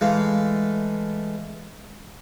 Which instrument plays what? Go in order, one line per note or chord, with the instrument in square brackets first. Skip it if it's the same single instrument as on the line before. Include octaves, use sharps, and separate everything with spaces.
[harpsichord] E3 G#3 A3 F5